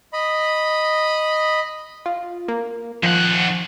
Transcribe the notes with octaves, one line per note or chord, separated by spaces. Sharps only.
D#5 B5
F4
A#3
D#3 F3 F#5